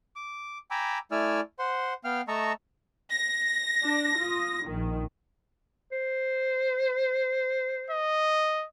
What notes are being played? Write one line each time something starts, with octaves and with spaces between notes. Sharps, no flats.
D6
G5 G#5 A#5 B5 D6 E6
A3 E4 D5 G#5 E6 F6
C5 F#5 C6
B3 F5 G5 F6
A3 D#5 A5 A#5 C#6 E6
A#6
D4
F4 D#6
A#1 D#3
C5
D#5